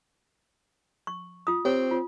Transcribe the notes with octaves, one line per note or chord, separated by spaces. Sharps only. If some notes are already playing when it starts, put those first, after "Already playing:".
C#6
F4 D#6
C4 G4 C#5
F4